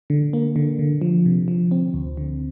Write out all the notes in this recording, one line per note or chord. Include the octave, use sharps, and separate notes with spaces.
D3
A#3
D3
D3
F3
C3
F3
C4
D2
D3